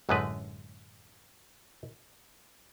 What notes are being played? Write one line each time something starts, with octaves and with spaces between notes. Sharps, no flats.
A1 F#2 D3 G#3 A3 B4